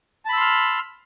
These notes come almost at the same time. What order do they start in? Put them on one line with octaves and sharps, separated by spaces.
A5 B5 E6 C6 F6